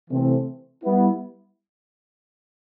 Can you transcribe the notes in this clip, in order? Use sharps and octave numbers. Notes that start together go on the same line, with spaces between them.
C3 E3 A3 C4
G3 B3 E4